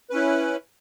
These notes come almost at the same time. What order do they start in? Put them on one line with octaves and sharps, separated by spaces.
B4 C#4 E4